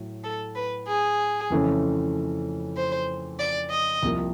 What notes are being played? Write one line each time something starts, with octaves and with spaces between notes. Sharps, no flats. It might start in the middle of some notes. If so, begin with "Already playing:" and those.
Already playing: A2 F#3
A4
B4
G#4
F2 C#3 E3 A3 C#4
C5
D5
D#5
C2 C3 F3 A#3